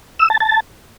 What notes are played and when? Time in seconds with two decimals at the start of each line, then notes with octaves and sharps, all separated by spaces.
0.19 E6
0.30 A5
0.40 A5